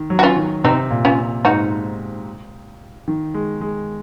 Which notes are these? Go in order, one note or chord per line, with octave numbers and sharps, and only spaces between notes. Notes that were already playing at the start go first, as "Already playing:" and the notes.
Already playing: D#3
F#3
F#4
C#4 F4
D#3
C3 C4 D#4
A#2
C#4 F4
G#2 D#4 F#4
D#3
G#3
G#3